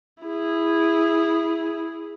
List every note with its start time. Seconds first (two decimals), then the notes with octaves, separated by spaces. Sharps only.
0.24 E4 G#4